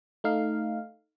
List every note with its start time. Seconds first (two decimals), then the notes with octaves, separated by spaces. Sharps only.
0.24 A3 D#4 F5